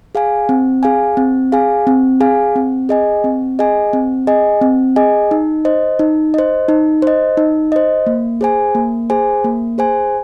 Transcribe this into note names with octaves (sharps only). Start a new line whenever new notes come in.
G#4 F5 G#5
C4
G#4 F5 G#5
C4
G#4 F5 G#5
C4
G#4 F5 G#5
C4
G#4 D#5 G#5
C4
G#4 D#5 G#5
C4
G#4 D#5 G#5
C4
G#4 D#5 G#5
D#4
C5 D#5
D#4
C5 D#5
D#4
C5 D#5
D#4
C5 D#5
A#3
G#4 C5 G#5
A#3
G#4 C5 G#5
A#3
G#4 C5 G#5